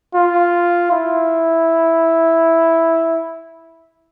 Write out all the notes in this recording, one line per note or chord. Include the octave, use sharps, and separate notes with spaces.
F4
E4